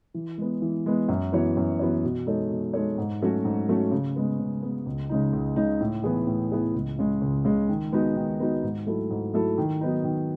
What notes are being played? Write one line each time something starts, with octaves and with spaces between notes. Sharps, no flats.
E3
G#3 B3
E3
G#3 B3
F#2
E3 B3 F#4 C#5
F#2
E3 B3 F#4 C#5
B2
G#3 D#4 A4 C#5
B2
G#3 D#4 A4 C#5
G#2
F#3 A3 C#4 F#4
G#2
F#3 A3 C#4 F#4
C#3
G#3 B3
C#3
G#3 B3
C#2
C#3 G#3 D#4
C#2
C#3 G#3 D#4
A2
E3 B3 E4 G#4
A2
E3 B3 E4 G#4
C#2
C#3 G#3
C#2
C#3 G#3
D#3
G#3 B3 D#4 F#4
D#3
G#3 B3 D#4 F#4
G#2
F#3 A3 E4 A4
G#2
F#3 A3 E4 A4
D#3
F#3 B3 D#4
D#3